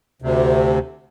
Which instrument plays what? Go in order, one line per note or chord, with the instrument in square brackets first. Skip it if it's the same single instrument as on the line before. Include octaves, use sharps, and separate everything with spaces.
[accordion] D2 C3